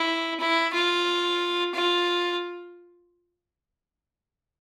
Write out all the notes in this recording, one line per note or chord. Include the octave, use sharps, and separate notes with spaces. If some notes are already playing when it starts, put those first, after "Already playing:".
Already playing: E4
E4
F4
F4